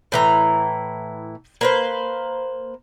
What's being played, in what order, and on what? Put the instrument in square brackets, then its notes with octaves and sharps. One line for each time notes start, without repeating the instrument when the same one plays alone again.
[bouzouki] A2 E3 A#5
A#3 B4 C5